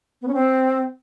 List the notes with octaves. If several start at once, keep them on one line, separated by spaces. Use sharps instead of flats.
B3
C#4
C4